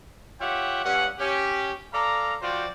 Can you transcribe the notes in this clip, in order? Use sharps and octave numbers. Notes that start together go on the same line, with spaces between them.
F4 G4 C#5 E5 F#5 G5
G2 C#4 F#5
C#4 G4
A4 D5 F5 A#5
F3 F4 F#4 C5 D5 G5